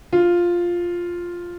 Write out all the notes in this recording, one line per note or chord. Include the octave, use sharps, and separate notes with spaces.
F4